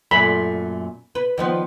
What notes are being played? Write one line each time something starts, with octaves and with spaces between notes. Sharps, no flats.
F#2 A#2 A3 B5
B4
D#3 F3 B3